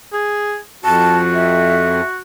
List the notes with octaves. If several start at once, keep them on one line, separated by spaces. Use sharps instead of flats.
G#4
F2 F#4 A5
E5